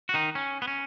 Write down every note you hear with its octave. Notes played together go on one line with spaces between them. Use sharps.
F#4
D#3 D#4
C#4
B3
C#4